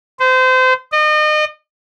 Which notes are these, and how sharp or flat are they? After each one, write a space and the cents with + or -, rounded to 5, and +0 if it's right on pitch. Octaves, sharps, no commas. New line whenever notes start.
C5 -30
D#5 -35